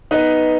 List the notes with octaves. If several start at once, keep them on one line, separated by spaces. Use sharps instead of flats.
B3 D#4 B4